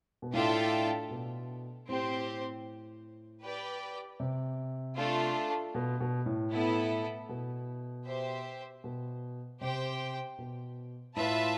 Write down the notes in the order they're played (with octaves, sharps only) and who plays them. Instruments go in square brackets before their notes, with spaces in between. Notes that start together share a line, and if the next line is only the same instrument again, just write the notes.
[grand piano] B2
[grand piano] A2 [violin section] D4 F4 A4 E5 G5
[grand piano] B2
[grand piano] A2 [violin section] C4 G4 C5
[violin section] G4 B4 D5 G5
[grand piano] C3
[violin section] A3 D4 F4 A4
[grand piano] B2
B2
A2
[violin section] B3 E4 A4
[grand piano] B2
[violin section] G4 C5 E5
[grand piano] B2
[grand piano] C3 [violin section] G4 C5 G5
[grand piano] B2
[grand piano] A2 [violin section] F4 B4 E5 A5